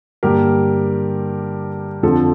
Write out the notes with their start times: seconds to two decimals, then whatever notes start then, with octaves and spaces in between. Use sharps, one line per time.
0.23 G2 D3 G3 A#3 G4 A#4
2.03 F2 D3 F3 A4